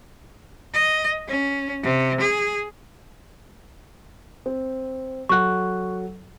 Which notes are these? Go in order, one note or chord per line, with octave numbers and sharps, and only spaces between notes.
D#5
C#4
C3
G#4
C4
F#3 A4 F#5 C#6 F#6